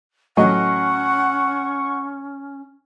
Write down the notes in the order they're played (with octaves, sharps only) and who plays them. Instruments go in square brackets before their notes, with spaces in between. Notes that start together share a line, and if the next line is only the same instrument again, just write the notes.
[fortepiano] A2 F#3 D#5 [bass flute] C#4 [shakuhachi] F#5 [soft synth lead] C#6